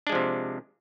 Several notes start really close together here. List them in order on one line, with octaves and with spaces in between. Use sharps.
D4 G#3 F3 C3